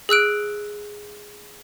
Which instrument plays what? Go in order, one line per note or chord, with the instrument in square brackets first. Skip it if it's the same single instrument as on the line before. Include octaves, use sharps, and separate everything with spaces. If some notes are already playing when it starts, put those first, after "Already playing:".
[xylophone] G#4 E6 F#6 D7